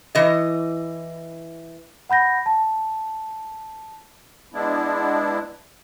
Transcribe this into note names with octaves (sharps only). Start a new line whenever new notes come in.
E3 D#5
F#5 B5 G6 A#6
A5
G#3 B3 D4 E4